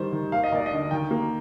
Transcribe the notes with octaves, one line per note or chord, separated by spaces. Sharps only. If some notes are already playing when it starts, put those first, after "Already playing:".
Already playing: D#3 G3 C5
D#3
D#2 F5
D#5
D#2 D5
D#5
D3
D#3 G5
A#3